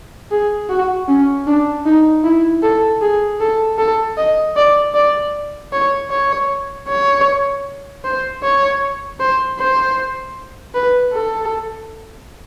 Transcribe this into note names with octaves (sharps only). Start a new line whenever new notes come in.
G#4
F#4
C#4
D4
D#4
E4
A4
G#4
A4
A4
D#5
D5
D5
C#5
C#5
C#5
C5
C#5
C5
C5
B4
A4